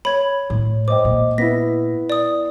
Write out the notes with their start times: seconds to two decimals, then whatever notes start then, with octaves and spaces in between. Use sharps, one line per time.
0.05 C#5 B5 G#6
0.50 A2
0.88 C5 D#5 G5 D6
1.05 A#2
1.38 B3 E4 A#6 B6
2.10 D5 D#6